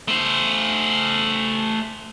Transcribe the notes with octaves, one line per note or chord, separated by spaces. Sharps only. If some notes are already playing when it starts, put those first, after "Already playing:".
A3 C5